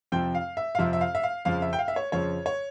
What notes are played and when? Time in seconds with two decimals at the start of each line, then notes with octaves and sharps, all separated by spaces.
0.12 F2 C3 F3 C4 G5
0.35 F5
0.57 E5
0.75 F5
0.79 F2 C3 F3 C4 E5
0.93 E5
1.01 F5
1.15 E5
1.23 F5
1.45 F2 C#3 F3 F5
1.62 E5
1.73 G5
1.79 F5
1.88 E5
1.96 C#5
2.12 F2 C#3 F3 C#5
2.46 C#5